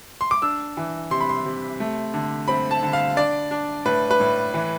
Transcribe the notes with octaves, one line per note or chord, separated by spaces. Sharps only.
C6
D6
D4 E6
E3
C3 C6
B5
C6
C3
A3
D3
C4 B5
A5
D3
F5
D4 D5
D4
A2 B4
B4
A2
E3